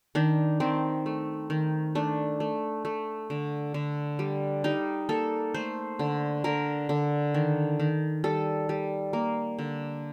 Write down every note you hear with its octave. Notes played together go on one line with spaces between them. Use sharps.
D#3 D4
D#3 C4
A3
D#3
A3 D4
A3
A3
D3
D3
G3
G3 D#4
A#3 A4
A3 C5
D3
D3 A#4
D3
D#3
D#3
G3 A4
G3
A#3
D3